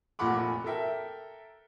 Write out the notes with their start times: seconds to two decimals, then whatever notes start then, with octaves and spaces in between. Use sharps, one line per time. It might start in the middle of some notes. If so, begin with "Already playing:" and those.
0.19 F1 A#2 A3 F#5 B5 D6
0.64 A4 A#4 E5 G5